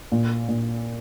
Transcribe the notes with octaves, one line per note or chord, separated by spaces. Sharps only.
A#2
A#2